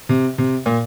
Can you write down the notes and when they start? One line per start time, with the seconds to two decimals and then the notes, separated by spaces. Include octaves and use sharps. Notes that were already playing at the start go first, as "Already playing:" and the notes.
0.09 C3
0.38 C3
0.66 A#2